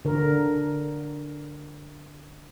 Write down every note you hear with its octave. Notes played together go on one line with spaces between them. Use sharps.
D3 A#4